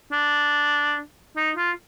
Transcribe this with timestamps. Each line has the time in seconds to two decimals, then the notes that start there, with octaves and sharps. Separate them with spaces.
0.12 D4
1.37 D#4
1.57 F4